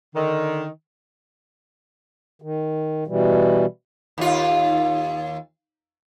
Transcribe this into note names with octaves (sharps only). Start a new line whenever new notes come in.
D3 D#3
D#3
B2 E3 G3
D#2 F4